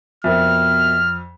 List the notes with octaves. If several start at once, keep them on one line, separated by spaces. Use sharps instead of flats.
F2 B2 A#4 E5 F6